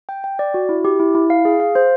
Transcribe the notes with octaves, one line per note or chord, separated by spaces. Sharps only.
G5
G5
D5
F#4
E4
G4
E4
E4
F5
G#4
F5
C5